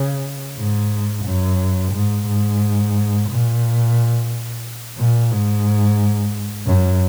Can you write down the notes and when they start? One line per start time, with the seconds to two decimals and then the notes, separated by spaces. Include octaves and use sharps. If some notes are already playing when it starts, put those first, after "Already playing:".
Already playing: C#3
0.58 G#2
1.25 F#2
1.93 G#2
2.27 G#2
3.29 A#2
4.98 A#2
5.31 G#2
6.66 F#2